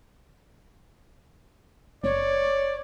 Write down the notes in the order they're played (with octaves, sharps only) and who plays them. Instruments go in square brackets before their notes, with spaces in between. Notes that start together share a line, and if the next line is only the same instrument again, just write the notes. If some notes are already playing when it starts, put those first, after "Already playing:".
[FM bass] F#1 [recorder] C#5 [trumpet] D5